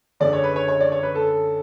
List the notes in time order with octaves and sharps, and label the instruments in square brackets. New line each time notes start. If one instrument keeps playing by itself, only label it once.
[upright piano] F#2 D3 G#3 D5
C#5
B4
C#5
C#5
D5
C#5
B4
A4